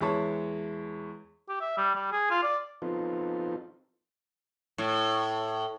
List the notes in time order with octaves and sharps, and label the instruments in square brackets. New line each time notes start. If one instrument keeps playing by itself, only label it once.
[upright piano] E2 G#3 E4 C#5 A5 C#6
[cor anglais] G4
E5
G3
G3
G#4
F4
D5
[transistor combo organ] F3 B3 C4 D#4 F4 A4
[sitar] A2